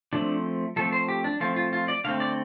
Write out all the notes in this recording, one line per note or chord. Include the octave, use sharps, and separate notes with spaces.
F3 A3 C4 D4
F3 A3 C4 A4
C5
G4
D4
F3 A3 C4 F4
F4
F4
D5
D3 A3 C4 F5
D5